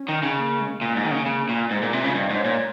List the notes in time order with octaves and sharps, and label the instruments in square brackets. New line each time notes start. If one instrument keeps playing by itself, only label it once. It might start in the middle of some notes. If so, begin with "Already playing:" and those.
Already playing: [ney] C#4
[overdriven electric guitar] D#3
C#3
[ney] A#3
G#3
[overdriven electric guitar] A#2 [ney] A#3
[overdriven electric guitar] G#2
D#3
C#3
C#3
A#2
[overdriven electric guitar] G#2 [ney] G#3
[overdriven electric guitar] A#2
[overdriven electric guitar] C3 [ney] F4
[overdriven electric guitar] C#3
[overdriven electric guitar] G2 [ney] D#5
[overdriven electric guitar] G#2
[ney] C#5
[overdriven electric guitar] A#2